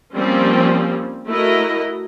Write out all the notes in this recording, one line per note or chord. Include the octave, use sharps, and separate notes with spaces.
F3 G3 A#3 C4 C#4
A3 E4 F#4 A4 A#4 D#5